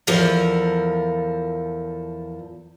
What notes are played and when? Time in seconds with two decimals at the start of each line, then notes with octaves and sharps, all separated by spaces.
0.07 E2 F3 A4 A#4 E5